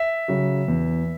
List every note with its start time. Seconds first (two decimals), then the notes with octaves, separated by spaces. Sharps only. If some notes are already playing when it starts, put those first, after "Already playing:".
Already playing: E5
0.28 C#3 F#3
0.68 E2